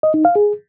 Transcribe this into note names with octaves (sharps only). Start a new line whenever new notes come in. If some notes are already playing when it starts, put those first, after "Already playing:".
D#5
D#4
F5
G#4